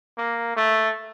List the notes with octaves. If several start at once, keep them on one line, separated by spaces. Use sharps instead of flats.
A#3
A3